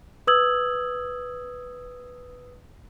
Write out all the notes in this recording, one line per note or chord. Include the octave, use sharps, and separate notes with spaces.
B4 D#6 E6 G#6 F#7